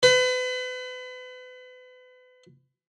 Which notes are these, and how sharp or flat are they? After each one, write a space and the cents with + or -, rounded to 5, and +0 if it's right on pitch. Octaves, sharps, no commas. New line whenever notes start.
B4 +35